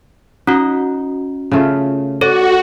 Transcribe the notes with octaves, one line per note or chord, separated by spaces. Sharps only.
C#4 D#4 F#4
C#3 A3 F4
F#4 A4 C#5 D5 F#5